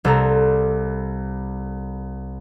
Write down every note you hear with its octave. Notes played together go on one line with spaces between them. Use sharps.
C2 A4 A#5